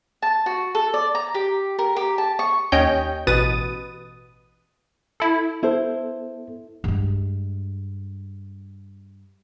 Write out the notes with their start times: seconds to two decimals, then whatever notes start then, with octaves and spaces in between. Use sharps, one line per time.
0.22 A5
0.46 F#4
0.75 A4
0.94 D5
1.15 A#5
1.35 G4
1.79 A#4
1.96 G4
2.18 A5
2.39 C#6
2.72 D#2 C#4 C#5 D#5 G5 G6
3.27 A1 B2 B4 D#6 A6 D#7
5.20 E4 A4
5.63 B3 E4 A4 C5
6.84 G2 G#3